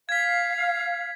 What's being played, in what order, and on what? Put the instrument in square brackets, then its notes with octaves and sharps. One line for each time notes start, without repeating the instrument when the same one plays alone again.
[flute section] F5 [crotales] G#6 B6